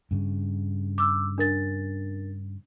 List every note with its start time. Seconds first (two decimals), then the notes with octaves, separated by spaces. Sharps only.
0.11 G2 C#3
0.98 D6 E6
1.38 D4 A#4 A6